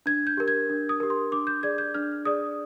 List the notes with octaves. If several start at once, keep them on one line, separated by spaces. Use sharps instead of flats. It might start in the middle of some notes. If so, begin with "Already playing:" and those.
D4 G#6
G6
G4 A#4
G#6
D4
D#6
G4 A#4
C6
D4 D6
G6
G#4 D5 G#6
G6
D4 F6
G#4 D5 D#6